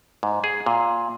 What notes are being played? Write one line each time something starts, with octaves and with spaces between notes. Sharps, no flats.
G#2
G#4
A#2